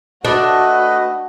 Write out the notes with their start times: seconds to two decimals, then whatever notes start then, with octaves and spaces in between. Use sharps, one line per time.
0.25 A3 D4 F#4 B4 D#5